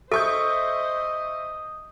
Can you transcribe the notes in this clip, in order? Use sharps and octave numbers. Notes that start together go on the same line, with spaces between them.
A4 C5 D#5 E5 C#6 D#6 G6